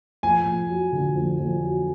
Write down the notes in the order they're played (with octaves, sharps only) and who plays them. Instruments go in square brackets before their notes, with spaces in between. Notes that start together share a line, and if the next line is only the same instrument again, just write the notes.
[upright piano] F2 [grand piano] G#5
[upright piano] F2
F#3
D3
F2
F2
F#3